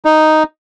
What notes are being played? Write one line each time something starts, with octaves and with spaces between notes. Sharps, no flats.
D#4